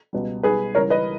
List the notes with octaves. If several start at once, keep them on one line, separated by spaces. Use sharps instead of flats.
C#2 B2 G3
B1 B2 G3 G#4 B4
C#2 C#3 E3 G3 A#4 C#5
B4 D#5